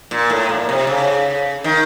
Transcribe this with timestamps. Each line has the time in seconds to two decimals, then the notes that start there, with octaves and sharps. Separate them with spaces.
0.11 A#2
0.30 A2
0.49 A#2
0.69 C3
0.87 C#3
1.64 D#3